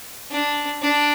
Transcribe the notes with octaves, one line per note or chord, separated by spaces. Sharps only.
D4
D4